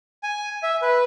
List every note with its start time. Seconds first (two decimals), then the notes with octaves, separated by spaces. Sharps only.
0.23 G#5
0.63 E5
0.82 B4